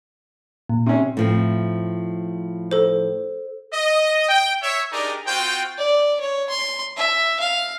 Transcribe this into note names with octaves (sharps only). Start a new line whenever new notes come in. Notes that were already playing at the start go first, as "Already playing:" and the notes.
A#2
C3 C#4
A2 F3 C4
A4 C5
D#5
G5
C#5 E5
D4 D#4 G4 G#4 A#4 D5
C4 F4 F#4 C5 G5
D5
C#5
C6
E5
F5